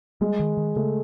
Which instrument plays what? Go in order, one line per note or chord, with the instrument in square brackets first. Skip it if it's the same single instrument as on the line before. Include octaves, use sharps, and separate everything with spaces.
[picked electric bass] G3 [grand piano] G#3
[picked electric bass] D#3
D#3
[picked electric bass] C#3 [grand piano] A3